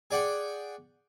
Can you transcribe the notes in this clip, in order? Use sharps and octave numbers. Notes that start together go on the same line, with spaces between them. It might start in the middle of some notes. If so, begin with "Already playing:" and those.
G#4 D5 F#5 G5